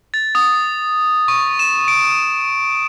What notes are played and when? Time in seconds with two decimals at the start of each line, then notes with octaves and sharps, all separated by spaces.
0.14 A6
0.35 D#6
1.28 C#6
1.59 E7
1.88 D7